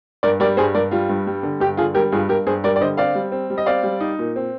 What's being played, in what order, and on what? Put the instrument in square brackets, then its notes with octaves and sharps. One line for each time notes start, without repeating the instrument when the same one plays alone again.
[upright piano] G2 A#4 D5
G3 A#4 D5
G2 G#4 C5
G2 A#4 D5
G3 F4
G2
G3
D3
G2 G4
D3 F4 G#4
G3 G4 A#4
G2 F4 G#4
G2 G4 A#4
G2 G#4 C5
G3 A#4 D5
D5
D3 C5 D#5
C4 D5 F5
G3
C4
G3
D#5
C4 D5 F5
G3
D#4
A#2
C4